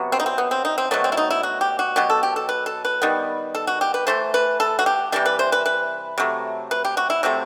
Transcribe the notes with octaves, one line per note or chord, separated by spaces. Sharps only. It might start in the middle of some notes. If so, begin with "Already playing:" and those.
Already playing: C3 F#3 B3
C4
D#4
C4
B3
C4
D#4
C4
B2 F#3 A3 B3
C4
E4
D#4
E4
F#4
G4
F#4
B2 F#3 B3 G4
A4
G4
A4
B4
A4
B4
D#3 G3 B3
A4
F#4
G4
B4
E3 A3 C5
B4
A4
F#4
G4
C3 E3 G3 G4
B4
C5
B4
B4
C3 F#3 A3
B4
G4
F#4
E4
C3 F#3 A3 C4